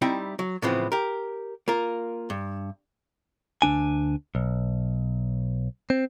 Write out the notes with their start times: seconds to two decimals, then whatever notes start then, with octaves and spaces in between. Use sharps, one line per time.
0.02 G3 C4 D#4 E4 E5 G5
0.39 F#3
0.62 A2 C#3 E3 F3 B3 C4
0.92 G4 A#4
1.68 A#3 F4 A#4
2.30 G2
3.62 D2 F3 D4 G#5
4.35 B1
5.90 C4